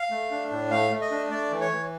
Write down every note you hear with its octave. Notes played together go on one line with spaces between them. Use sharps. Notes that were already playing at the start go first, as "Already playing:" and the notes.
Already playing: F5
A3
D4
A2
A3 F5
A3
D#5
D4
A3 D5
E3
C#5
E3